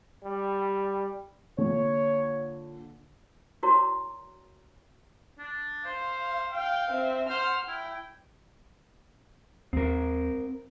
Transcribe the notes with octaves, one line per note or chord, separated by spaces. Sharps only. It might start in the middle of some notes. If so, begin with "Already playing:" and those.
G3
A#2 D3 C#5
E4 F#4 A#4 C#5 D5 A#5
D4
C5 F5
F5 G5
C4 E5
C5 F#5 F6
E4 G5
D#2 C4 A#4